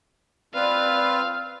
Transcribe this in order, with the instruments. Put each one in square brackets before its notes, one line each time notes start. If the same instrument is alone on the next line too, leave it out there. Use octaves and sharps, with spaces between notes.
[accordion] C4 F4 B4 [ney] D5 [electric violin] F5